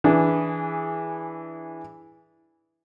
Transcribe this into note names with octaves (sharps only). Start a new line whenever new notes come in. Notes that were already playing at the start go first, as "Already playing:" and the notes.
E3 D4 E4 G#4